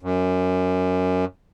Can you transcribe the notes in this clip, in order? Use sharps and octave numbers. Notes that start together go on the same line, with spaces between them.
F#2